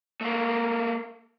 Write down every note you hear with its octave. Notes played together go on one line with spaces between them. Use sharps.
A3 A#3